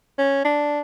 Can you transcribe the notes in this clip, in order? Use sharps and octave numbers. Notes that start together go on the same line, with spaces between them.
C#4
D4